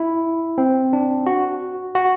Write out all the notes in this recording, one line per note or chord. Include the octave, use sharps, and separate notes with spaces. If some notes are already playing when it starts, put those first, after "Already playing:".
Already playing: E4
C4
D4
F#4
F#4